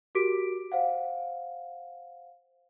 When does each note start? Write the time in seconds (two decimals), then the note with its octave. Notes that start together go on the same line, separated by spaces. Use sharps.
0.15 F#4 G4 A#4 D6 B6 D7
0.72 C5 F5 F#5